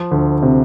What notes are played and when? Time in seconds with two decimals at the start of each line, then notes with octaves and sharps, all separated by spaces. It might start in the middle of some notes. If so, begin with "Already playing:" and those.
Already playing: F3
0.11 D2
0.42 C3